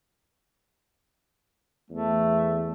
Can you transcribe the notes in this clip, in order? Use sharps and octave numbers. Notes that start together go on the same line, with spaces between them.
E2 A3